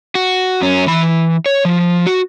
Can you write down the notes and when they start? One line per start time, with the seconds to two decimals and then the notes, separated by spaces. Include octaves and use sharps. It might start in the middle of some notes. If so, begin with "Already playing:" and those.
0.15 F#4
0.62 F#2 C#4
0.88 E3 B5
1.46 C#5
1.65 F3
2.07 F#4